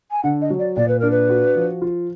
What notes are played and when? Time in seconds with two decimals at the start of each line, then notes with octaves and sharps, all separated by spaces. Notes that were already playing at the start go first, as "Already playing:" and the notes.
0.11 G#5
0.23 D3 F#5
0.41 D#5
0.50 F#3
0.59 D5
0.76 A#2 D5
0.88 B4
0.99 D4 A#4
1.11 B4
1.29 F#4
1.56 F3
1.82 F4